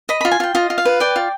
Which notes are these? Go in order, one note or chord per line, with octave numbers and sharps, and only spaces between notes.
D#5 B5
F4 B5
G#5
F4 G5
F4 D#5
F4
F5
B4
D5 G5
F4